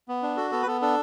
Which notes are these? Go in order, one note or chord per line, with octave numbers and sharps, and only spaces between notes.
B3
D4
F#4 A4
B3 A4
B4
B3 A4
D4 A4